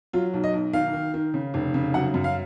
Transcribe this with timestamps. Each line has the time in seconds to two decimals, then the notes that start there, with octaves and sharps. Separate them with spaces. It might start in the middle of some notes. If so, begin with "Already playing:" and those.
0.13 F#3 F4
0.33 B1
0.44 D#5
0.53 B1
0.73 D#3 F5
0.93 D#3
1.14 D#3
1.34 C#3
1.54 F1
1.74 C#3
1.94 F#3 F#5
2.14 F#2
2.24 F5